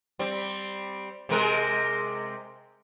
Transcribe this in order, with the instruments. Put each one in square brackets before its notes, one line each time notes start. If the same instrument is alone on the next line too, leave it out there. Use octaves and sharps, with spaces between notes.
[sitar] G3 C4
C3 G#3 A#4